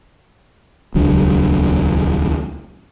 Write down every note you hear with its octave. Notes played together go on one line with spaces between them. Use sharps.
D#1 C#2 F#3 D4